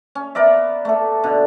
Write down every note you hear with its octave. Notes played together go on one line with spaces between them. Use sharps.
C#4
B3 A#4 D5 E5
A3 A4
B2 D3